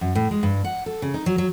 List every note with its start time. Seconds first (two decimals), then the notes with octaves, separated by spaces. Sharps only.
0.01 F#2
0.15 A2
0.31 G#3
0.43 G2
0.64 F#5
0.86 A4
1.02 C#3
1.14 D#4
1.26 F#3
1.38 F#3